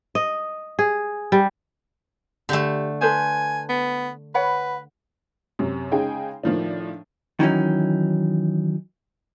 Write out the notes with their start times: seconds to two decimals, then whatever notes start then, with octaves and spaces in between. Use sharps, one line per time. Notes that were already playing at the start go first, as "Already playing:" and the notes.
0.15 D#5
0.79 G#4
1.32 G3
2.49 D3 A3 G4
3.01 A4 B4 C5 G#5
3.69 B3
4.35 B4 C#5 F#5 B5
5.59 F#2 C3
5.92 C#3 G#3 D#4 G#4 G5 G#5
6.43 A2 D#3 F3 D4
7.40 D#3 E3 F#3 C#4 D#4